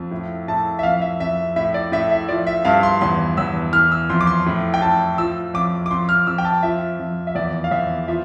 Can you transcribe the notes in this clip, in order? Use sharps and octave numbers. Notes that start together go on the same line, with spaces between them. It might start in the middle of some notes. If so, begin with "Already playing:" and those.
Already playing: F2 F3
A2
A2 A5
E5
F2 F5
E5
F2 E5
A2 E5
D5
A2 E5
E5
F3 D5
E5
G2 F5
C6
E2 C6
E2 E6
E3 F6
E6
F2 C6
D6
C6
A2
G5
A2 A5
F3 E6
F2 D6
D6
F2 C6
F6
F2 E6
G5
A5
F3 E5
F2
E5
E2 D5
F5
E2 E5
F3 E5